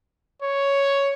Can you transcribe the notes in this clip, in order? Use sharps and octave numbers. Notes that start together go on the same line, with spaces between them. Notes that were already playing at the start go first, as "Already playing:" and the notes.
C#5